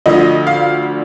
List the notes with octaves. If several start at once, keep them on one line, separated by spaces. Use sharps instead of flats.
D2 D3 F3 D#5
F5